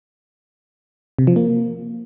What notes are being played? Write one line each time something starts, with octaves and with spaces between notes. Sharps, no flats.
C3
F3
A#3